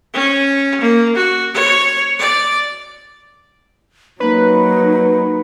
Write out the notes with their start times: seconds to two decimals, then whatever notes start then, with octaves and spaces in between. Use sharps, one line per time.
0.14 C#4
0.81 A#3
1.16 F#4
1.54 C#5
2.19 D5
4.20 F#3 A#3 C#4 D#4 B4